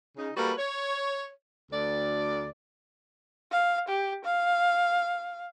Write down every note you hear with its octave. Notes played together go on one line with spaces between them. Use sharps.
C#3 D#4
G3 A#3 F#4 A4 B4
C#5
D2 D5
F5
G4
F5